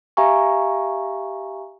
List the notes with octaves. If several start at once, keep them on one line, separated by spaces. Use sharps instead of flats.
G4 E5 F5 G#5 A#5 C#6